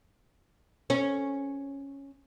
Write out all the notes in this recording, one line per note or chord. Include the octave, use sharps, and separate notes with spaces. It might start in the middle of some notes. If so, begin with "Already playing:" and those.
C#4